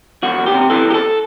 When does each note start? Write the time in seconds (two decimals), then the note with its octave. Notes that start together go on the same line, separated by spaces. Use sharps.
0.23 E2 F#4
0.39 E2
0.46 G4
0.54 C3
0.70 E3 A4
0.86 E2 G4
0.94 A4